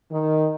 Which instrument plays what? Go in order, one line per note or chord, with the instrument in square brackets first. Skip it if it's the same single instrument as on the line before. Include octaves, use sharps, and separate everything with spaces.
[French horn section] D#3